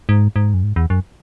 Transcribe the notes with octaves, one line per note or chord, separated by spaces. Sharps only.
G#2
G#2
F#2
G#2
E2
F#2